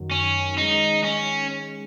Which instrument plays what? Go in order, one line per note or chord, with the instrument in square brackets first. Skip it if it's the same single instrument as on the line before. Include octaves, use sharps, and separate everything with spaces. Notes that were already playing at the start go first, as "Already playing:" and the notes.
Already playing: [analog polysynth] F#2 D#3 F#3
[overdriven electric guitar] C#4
[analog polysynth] D#3 G#3 C#4 [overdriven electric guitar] D#4
[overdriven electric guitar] C#4